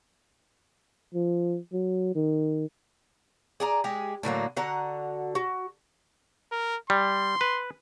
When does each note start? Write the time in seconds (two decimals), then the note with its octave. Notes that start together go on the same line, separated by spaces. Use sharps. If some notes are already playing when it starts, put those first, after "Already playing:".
1.15 F3
1.73 F#3
2.15 D#3
3.60 G#4 D5 A#5
3.84 G#3 G4 G#4
4.23 A2 D3 F#3 A#3
4.57 D3 F#4 F#5 A#5
5.35 F#4
6.52 A#4
6.90 G3 C6
7.41 B4